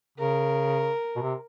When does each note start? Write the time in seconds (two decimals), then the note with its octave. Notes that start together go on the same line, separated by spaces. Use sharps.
0.18 C#3 A#4
1.16 B2
1.22 C3